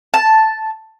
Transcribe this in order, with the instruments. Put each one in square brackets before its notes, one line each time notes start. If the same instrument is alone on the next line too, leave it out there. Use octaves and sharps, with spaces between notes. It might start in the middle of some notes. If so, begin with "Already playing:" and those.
[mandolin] A5